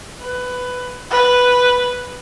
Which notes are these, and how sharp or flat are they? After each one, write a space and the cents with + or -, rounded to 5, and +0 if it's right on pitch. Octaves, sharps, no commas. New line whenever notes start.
B4 +15
B4 +0